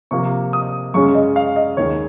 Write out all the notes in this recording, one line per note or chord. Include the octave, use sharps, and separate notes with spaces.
C3 F3 A#3 C#6
D#6
F#2 C#3 G#3 C#4 C#6
D#5
F5
D#5
D#2 D#3 G#3 C#5